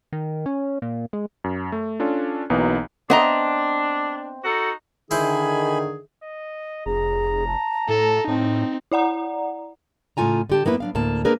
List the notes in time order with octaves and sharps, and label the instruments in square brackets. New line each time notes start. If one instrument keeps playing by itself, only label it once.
[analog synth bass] D#3
C#4
A#2
G#3
[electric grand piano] F#2
A3
C#4 D4 F4 A4
B1 E3 F#3 A#3 B3 D#4
[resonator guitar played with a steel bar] B3 D#5 A#5 [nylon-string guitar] C4 E5 [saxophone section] D4
[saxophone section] D#4 F#4 A4
[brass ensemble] D3 D#3 [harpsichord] E4 C5 [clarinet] G#4 [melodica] G#5 B5
[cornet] D#5
[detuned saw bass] F1 [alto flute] G#4 [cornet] A#5
[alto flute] A5
[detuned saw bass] A2 [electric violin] A4
[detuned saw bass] A2 [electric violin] C4 D#4
[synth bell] E4 D5 F#5 A#5
[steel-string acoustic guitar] A2 C#3 A3 F4 G#5 A#5
D3 G4 A5
F#2 A#3 B3 E4 A4 B4
F#3 D4 F5
D2 A2 A#3 A5
A#3 D4 G#4 A#4 B4 D5